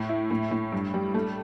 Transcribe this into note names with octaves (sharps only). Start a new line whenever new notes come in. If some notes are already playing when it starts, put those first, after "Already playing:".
Already playing: A2
E4
A2
A2
G2
G3
A3